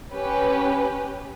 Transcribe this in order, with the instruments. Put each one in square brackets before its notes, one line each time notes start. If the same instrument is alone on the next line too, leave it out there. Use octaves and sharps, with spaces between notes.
[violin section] C#4 G4 B4